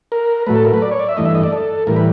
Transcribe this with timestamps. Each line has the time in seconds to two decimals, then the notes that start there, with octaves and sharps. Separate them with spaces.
0.12 A#4
0.46 A2 F#3 A3 B4
0.55 A4
0.65 A#4
0.74 B4
0.82 D5
0.91 C#5
0.99 D5
1.09 E5
1.17 G2 E3 A3 D#5
1.26 E5
1.35 D#5
1.43 D5
1.52 A4
1.87 A2 E3 G3 A#4
1.96 B4